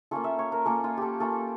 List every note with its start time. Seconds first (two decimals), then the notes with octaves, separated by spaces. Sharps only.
0.11 A#3 C#4 F4 A4
0.24 E5
0.39 C#5
0.52 A#4
0.65 A#3 C#4 F4 A4
0.84 F4
0.97 G4 A4
1.20 A#3 C#4 F4 A4